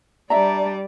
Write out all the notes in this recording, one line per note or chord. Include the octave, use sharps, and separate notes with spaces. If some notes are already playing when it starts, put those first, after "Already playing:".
G3 D4 D5 E5 A#5